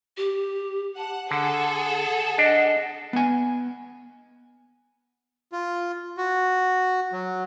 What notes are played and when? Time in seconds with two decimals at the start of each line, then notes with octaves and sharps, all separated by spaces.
0.17 G4
0.97 F#5 A5
1.31 D3 G#4 A4 F#5
2.38 D4 D#5
3.13 B3 G#5
5.52 F4
6.17 F#4
7.12 F#3